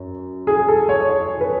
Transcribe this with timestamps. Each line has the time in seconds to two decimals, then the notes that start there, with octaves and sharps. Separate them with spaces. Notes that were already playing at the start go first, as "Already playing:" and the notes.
Already playing: F#2
0.47 G#4
0.68 A4
0.89 C#5
1.09 C#5
1.41 B4